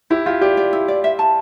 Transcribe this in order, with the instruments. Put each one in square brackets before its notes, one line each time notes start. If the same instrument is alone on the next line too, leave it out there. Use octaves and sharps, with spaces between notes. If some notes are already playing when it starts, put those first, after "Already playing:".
[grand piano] E4 [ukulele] G4
[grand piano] F4 [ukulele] G4
[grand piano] G4 [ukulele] D5
[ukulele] D5
E4
D5
E5
A5